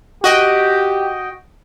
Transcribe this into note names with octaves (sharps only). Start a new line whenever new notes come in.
F#4 G4 D#5 G5